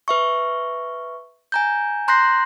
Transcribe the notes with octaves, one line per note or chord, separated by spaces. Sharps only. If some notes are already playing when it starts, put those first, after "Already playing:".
B4 E5 C#6
G#5 A#5 G6
A#5 C6 F#6 G6 A#6 C7